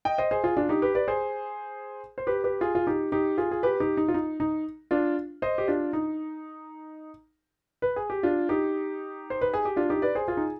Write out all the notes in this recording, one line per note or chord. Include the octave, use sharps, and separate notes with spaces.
D#5 G5
C5 D#5
G#4 C5
F4 G#4
D4 F4
D#4 G4
G4 B4
B4 D5
G#4 C5
C5
G4 B4
G4 B4
F4 G#4
F4
D#4 G4
D#4 G4
F4 G#4
G#4
G4 B4
D#4 G4
D#4
F4
D#4
D#4
D4 F4
C5 D#5
G4
D4 F4
D#4
B4
G#4
G4
D4 F4
D#4 G4
C5
B4
G#4
G4
D4 F4
D#4 G4
B4 D5
G#4 C5
F4 G#4
D#4